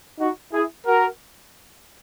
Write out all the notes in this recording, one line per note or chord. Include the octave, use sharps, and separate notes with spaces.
D#4 F#4
E4 G#4
F#4 A#4